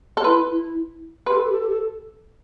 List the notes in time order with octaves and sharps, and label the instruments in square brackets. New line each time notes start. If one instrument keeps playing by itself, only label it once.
[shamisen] A4
[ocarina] E4 [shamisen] B4
[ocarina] E4
[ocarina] G4 [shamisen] B4
[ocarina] A4
G4
A4
G4
A4